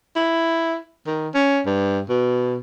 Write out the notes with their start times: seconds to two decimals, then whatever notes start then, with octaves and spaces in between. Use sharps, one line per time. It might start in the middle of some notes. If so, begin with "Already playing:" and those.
0.16 E4
1.07 D#3
1.35 C#4
1.66 G2
2.09 B2